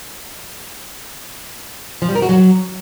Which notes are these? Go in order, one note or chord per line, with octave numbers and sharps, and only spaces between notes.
F3
G3
A#4
F#4
F#3